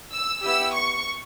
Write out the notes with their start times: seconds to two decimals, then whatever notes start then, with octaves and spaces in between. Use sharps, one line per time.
0.13 E6
0.42 B3 E4 G4 E6
0.74 C#6